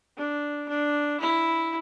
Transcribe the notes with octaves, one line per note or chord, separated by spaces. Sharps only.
D4
D4
E4